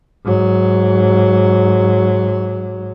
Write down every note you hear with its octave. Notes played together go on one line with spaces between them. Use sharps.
G#2 F#3